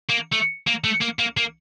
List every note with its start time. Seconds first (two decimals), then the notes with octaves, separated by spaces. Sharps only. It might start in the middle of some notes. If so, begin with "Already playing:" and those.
0.09 A#3
0.32 A3
0.67 A#3
0.84 A3
1.01 A#3
1.19 A#3
1.37 A#3